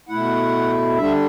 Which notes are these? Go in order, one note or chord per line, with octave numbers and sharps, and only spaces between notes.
B2 A3 E4 F#5
D3 G3 D4 E5